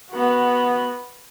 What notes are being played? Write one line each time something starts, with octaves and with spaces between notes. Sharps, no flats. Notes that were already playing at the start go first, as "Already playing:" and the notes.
B3 F#4